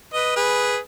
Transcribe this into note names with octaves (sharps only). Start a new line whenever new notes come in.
B4 D#5
G#4 B4